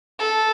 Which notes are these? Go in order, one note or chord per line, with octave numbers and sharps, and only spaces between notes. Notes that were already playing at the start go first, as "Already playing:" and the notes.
A4